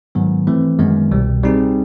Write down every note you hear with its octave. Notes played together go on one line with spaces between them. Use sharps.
G#2 D#3 F#3 B3
E3 A3 C4
F#2 D#3 G#3 B3
C2 B2 G3
G3 C4 D#4 G#4